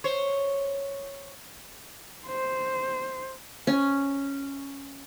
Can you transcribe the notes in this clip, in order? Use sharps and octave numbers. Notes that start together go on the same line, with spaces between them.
C5 C#5
C5
C#4